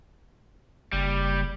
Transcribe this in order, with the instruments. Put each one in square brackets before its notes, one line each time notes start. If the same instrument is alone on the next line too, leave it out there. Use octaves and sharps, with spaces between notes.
[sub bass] F#1 [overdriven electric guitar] G3